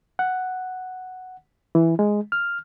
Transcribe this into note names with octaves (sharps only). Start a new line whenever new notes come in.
F#5
E3
G#3
F6